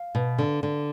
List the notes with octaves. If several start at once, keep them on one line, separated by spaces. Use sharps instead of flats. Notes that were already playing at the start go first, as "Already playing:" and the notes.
Already playing: F5
B2
D3
D3